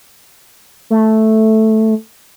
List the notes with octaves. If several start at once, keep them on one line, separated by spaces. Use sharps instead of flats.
A3